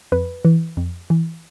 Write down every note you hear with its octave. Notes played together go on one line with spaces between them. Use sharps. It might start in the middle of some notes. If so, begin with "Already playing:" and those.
F2 B4
E3
F2
E3